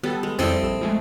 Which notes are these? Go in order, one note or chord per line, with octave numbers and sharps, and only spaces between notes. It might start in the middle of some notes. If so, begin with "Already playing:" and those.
G3 B3 A4
G#3
F2 G3 C4 E4 A4 D#5
A#1 E7
F3 G#3 A3